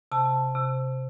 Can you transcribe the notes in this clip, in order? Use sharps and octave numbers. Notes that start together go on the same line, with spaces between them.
C3 A5
C3